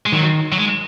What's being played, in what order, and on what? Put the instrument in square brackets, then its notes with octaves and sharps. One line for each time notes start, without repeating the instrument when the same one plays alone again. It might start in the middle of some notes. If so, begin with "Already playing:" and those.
[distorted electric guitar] G#3
[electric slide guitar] D#3 [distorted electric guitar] F#3
[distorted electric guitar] F#3
G#3